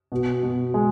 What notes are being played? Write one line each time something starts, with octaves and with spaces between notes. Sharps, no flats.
B2
B2
G#3